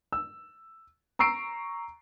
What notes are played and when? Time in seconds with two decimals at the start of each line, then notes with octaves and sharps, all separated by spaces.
0.12 E6
1.19 A#5 C#6 E6 C7 D7